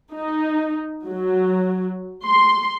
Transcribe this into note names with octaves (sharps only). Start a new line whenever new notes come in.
D#4
F#3
C6